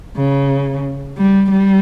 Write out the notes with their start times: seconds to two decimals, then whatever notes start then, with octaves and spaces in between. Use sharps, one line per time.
0.16 C#3
1.17 G3
1.50 G3